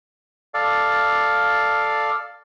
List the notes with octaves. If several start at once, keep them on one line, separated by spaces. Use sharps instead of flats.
A4 D5 F5